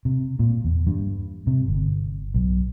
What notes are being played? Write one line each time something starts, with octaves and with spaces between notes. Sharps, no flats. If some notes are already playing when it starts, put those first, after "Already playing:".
C3
A#2
E2
G2
C3
G1
B1